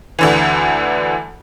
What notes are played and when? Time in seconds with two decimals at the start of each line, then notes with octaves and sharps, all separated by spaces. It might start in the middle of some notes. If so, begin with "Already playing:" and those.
0.19 D2 D3 E3